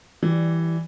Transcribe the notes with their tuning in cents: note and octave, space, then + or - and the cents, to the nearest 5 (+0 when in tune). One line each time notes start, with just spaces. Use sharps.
E3 +0 G3 -5 D5 +5